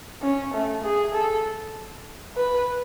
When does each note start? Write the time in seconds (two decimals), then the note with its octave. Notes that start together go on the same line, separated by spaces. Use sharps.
0.22 C#4
0.54 A3
0.84 G#4
1.14 A4
2.36 B4